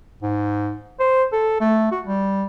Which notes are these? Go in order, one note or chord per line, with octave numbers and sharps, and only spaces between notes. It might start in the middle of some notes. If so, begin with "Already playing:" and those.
G#2
C5
A4
A3
F#4
G3